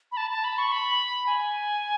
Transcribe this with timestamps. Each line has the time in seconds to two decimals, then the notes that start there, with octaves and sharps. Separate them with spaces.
0.12 B5
0.17 A5
0.30 A5
0.44 B5
0.58 C#6
0.72 B5
1.26 G#5